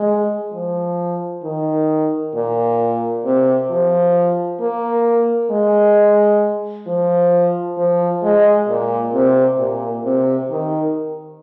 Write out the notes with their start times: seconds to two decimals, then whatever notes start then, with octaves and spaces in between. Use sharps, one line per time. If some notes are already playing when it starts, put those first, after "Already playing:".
Already playing: G#3
0.53 F3
1.43 D#3
2.35 A#2
3.25 C3
3.70 F3
4.61 A#3
5.51 G#3
6.87 F3
7.78 F3
8.23 G#3
8.68 A#2
9.14 C3
9.58 A#2
10.04 C3
10.50 D#3